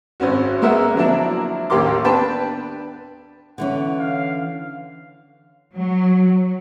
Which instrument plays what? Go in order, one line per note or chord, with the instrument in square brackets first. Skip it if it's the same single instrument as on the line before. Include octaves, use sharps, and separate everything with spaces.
[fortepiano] G#1 C4 C#4 F#4
G#3 A#3 B3 E5 F#5
D3 F3 F#3 A#3 D4 E4
A1 D#2 G4 A#4 C6 D6
B3 D4 B4 G5 A5
[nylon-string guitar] D3 E3 C#4 [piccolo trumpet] F#5
[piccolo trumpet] F5
[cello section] F#3